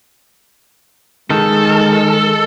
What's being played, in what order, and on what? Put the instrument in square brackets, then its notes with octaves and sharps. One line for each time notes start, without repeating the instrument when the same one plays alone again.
[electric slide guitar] D#3 [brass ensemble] G#3 [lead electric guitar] A4